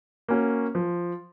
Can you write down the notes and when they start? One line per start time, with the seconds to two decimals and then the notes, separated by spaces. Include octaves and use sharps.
0.28 A#3 C#4 F#4
0.75 F3